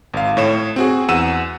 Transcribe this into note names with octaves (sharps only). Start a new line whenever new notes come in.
G#1 F5
A2 C#5 E7
C4 F#4 G#4
E2 F#5 E6 D#7 E7